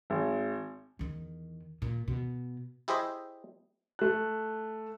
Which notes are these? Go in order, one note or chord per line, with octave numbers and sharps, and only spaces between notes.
G#1
E2 D#3
A#2
B2
E4 G4 G#4 C5 D#5 E5
A3 F#6